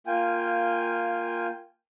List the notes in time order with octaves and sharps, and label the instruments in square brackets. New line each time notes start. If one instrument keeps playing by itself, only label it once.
[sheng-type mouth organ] A#3 F4 G5 G#5